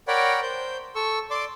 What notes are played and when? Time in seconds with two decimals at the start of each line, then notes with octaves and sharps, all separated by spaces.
0.08 A#4 C#5 D5 F#5 G5 B5
0.42 C5 G6
0.95 A4 C#6 E6
1.31 D5 C6 D6